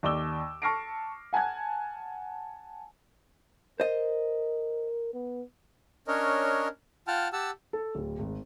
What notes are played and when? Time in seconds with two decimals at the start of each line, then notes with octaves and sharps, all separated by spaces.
0.03 D#2 D5 D6 E6 G7
0.62 A5 C#6 F6 A#6 C7 D7
1.33 F#5 G#5 A5 F#6 G#6
3.80 A#4 C5 D#5
5.13 B3
6.08 C#4 D4 A#4 C#5 D#5
7.07 F4 F#5 G5 A5 F6
7.33 G4 F#5 A5 E6
7.73 A4
7.95 D1
8.19 G#1